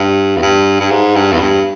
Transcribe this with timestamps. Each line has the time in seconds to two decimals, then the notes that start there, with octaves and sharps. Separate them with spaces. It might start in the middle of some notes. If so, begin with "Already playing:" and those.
Already playing: G2
0.37 E2
0.42 G2
0.80 G2
0.91 G#2
1.15 G2
1.33 E2
1.40 G2